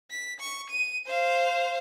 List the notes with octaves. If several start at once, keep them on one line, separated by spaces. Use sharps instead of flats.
B6
C#6
D#7
C5 F5